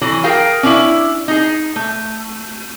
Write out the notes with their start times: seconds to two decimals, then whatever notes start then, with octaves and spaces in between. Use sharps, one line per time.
0.01 E3 F#3 A4
0.24 G#4 A#4 F5 G5
0.63 C#4 D4 E4
1.28 D#4 G#4
1.76 A3